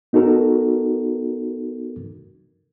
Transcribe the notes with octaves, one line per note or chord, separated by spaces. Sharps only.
B3 D#4 F#4 A4 A#4